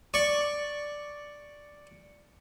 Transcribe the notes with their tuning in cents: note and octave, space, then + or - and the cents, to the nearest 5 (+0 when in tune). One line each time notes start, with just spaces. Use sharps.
D5 +0 C#6 +0